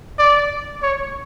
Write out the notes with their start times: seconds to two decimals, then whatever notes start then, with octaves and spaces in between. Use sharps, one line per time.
0.19 D5
0.82 C#5